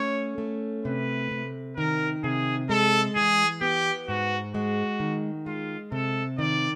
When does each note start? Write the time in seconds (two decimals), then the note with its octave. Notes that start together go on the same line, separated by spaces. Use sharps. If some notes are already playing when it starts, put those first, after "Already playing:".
Already playing: A3 C#4 C#5
0.38 A3
0.85 C3 B4
1.31 C3
1.77 D#3 A#4
2.23 C3 G#4
2.69 G#3 A4
3.15 E3 G#4
3.61 B3 G4
4.07 G#2 F#4
4.54 G#3 F#4
5.00 D#3
5.46 G#3 F4
5.92 C3 A4
6.39 D#3 D5